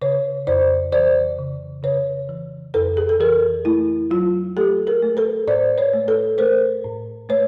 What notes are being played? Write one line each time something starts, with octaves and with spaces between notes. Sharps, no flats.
C#3 B4 C#5
F2 C5 D5
E3 C5 D5
C#3
C#3 B4 C#5
E3
F2 A4 B4
G#4
A4
E3 G#4 A#4
A3 E4
F#3 F4
A3 G4 A4
G#4 A#4
A3
A4 B4
A2 C5 D5
B4 C#5
A3
A4 B4
A3 A#4 C5
A2
A3 B4 C#5